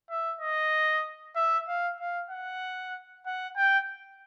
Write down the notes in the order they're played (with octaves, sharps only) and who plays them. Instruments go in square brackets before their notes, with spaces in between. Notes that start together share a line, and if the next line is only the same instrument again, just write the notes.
[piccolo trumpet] E5
D#5
E5
F5
F5
F#5
F#5
G5